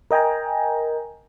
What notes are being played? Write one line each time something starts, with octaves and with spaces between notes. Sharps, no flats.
A#4 D#5 G5 G#5 A#5